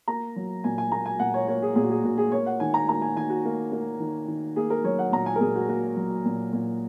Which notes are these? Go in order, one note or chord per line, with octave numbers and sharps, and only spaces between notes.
A#3 A#5
F#3
A#2 G#5
G#5
A#3 A#5
G#5
A#2 F#5
C#5
A#3 C#5
G#4
A#2 G#4
F#4
G#4
A#2 F#4
G#4
A#3 C#5
F#5
D#3 G#5
A#5
A#3 A#5
G#5
D#3 G#5
F#4
A#3
A#3
D#3
D#3
A#3 G#4
A#4
F#3 C#5
F#5
A#2 A#5
G#5
A#4
A#2 G#4
F#4
A#3 F#4
F#3
A#2
A#2